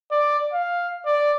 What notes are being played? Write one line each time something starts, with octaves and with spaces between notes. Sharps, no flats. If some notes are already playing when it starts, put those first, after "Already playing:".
D5
F5
D5